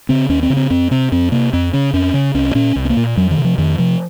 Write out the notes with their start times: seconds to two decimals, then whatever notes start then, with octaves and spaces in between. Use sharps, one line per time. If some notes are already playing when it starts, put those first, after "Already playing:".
0.09 C#3 C4
0.29 D#2 C#4
0.43 C4
0.50 C#3
0.57 C4
0.70 F2 C4
0.91 C3 C4
1.12 F2 C4
1.32 C3 A#3
1.53 F2 C4
1.73 C#3 C#4
1.93 F2 C#4
2.14 C#3
2.34 C2 C#4
2.55 A#2 C#4
2.76 C2
2.85 C4
2.90 A#3
2.97 A#2
3.17 F2 F#3
3.31 D#3
3.37 C3
3.45 F3
3.58 F2 D#3
3.78 C3 F3